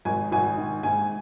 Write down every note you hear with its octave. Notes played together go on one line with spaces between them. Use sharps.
G#1 G#5
G#1 G#5
D#3
G#2 G#5